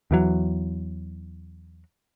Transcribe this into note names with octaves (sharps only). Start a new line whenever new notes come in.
E2 E3 F#3